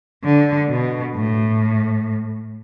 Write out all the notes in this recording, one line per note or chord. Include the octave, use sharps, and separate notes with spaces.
D3
B2
A2